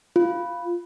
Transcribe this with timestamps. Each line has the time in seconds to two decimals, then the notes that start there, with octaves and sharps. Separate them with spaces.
0.16 F4